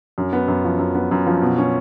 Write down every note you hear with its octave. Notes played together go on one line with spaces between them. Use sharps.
F#2
B3
F#2
F3
F#2
B3
F#2
F3
B2
C#4